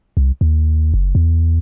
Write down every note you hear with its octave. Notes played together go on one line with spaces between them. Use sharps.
C2
D#2
F#1
E2